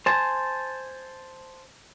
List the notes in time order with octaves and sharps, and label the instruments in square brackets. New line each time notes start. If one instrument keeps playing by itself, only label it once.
[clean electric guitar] C5 G#5 A5